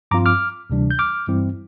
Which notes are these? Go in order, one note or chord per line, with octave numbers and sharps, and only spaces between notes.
G2 F3 C4 F4 A#5 D6
D6 F6
D2 C3 E3 G3 D4
G6
D6 F6
G2 E3 G3 C4 E4